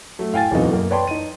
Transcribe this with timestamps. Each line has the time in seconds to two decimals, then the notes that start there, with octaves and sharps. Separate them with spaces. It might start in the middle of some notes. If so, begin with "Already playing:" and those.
0.19 F#3 A3
0.33 A2 F5 G5 G#5 A6
0.51 D1 E2 B2 C4 D#4
0.72 F#2 A#3
0.91 B4 C#5 D5 G5 A5 C6
1.07 D#4 D#7